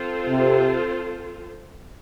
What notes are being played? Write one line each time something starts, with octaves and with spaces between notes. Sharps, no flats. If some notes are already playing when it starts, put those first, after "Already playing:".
Already playing: C4 F4 A4 C5
C3